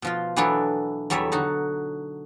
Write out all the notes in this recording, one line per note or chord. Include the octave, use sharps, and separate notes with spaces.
B2 F3 F4
E3 F#3 B3 D4 E4 A4
E2 F#3 G3 A4 C#5 E5
D3 D#4 F#4